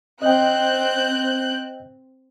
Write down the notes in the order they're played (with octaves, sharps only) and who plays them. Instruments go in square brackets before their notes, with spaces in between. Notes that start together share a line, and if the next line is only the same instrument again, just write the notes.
[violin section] C4 F#6 G6 [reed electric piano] D#5 G5